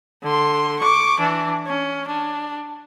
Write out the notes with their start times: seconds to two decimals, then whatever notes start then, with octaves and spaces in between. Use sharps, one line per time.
0.23 D3 C6
0.80 C#6 D6
1.19 E3 D4
1.67 C#4
2.08 D4